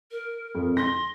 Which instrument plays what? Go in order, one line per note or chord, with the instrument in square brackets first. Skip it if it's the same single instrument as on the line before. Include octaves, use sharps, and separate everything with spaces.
[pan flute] A#4
[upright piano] F2
[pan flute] C6 [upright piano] A#6